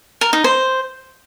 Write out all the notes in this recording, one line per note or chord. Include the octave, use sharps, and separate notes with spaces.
A#4
D#4
C5